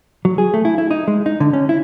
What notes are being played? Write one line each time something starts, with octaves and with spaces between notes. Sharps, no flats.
F#3
G#4
A3
E4
E4
D#4
G#3
D#4
D3
C#4
E4